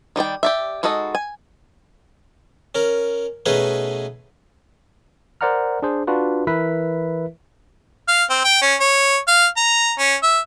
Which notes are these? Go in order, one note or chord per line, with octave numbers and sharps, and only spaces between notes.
D#3 G3 D5 G5
G4 D5 E5
G#3 D#4 F#4 A4 D#5
G#5
C#4 A#4
B2 A3 C#4 D#4 G#4 B4
A#4 C5 D5 F#5 A#5 F6
D4 G#4 C5
D4 F4 F#4 B4
E3 E4 A#4 B4 E5 B6
F5
C4
G5
C#4
C#5
F5
A#5
C#4
E5